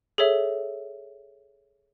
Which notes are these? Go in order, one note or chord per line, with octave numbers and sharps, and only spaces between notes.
G#4 A4 C#5 E5